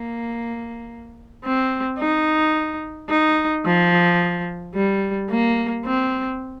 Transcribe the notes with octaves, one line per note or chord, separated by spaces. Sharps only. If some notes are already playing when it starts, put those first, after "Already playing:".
Already playing: A#3
C4
D#4
D#4
F3
G3
A#3
C4